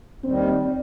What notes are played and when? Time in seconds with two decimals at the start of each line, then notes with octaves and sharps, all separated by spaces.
0.23 D#2 D#3 G3 C4